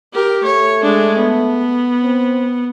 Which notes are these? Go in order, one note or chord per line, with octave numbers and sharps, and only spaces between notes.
G4 A#4
A3 C#5
G#3 D4
B3
C4